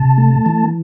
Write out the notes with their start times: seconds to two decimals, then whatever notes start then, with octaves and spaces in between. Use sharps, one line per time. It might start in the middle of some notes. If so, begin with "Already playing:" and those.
Already playing: C3 A5
0.18 A3
0.46 E3